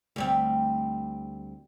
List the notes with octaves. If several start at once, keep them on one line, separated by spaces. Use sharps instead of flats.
D2 G3 C4